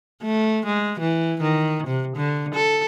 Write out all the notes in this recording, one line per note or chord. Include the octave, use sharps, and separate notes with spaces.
A3
G#3
E3
D#3
C3
D3
A4